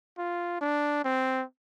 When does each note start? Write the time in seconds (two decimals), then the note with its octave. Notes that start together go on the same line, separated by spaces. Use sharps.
0.18 F4
0.61 D4
1.05 C4